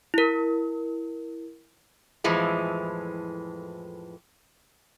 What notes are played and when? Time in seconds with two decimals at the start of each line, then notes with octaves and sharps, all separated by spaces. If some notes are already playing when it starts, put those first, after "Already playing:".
0.14 E4 A#4
2.24 F2 A2 E3 F3 G#3